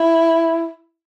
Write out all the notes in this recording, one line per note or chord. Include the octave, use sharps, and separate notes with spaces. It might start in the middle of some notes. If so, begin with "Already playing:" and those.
Already playing: E4